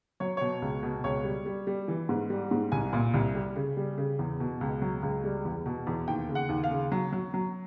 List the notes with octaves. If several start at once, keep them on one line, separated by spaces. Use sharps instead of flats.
F#3 C#5
B2 C#5
C#2
B2
C#2 C#5
G3
G3
G3
E3
G#2
G3
G#2
C2 G#5
A#2
C2
G3
C#3
G3
C#3
E2
B2
C#2
F#3
C#2
G3
E2
B2
E2
D#2 G5
C#3
F#5
D#2
F5
C#3
F#3
F#3
F#3